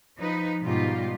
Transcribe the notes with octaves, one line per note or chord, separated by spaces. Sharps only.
F3 D#4 B4
G#2 B2 G3 D#4 F4 G4